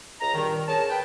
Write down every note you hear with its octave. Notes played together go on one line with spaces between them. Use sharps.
C#2 D#5 A#5
G2 A#2 D#3
C#4 G#4 A#4 A5
B4 G5